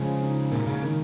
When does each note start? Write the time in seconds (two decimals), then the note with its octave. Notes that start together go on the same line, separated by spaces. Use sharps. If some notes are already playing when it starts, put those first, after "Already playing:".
Already playing: C#3 F3 G#3
0.22 D#4
0.52 A#2 A#3
0.67 C#3
0.83 D#3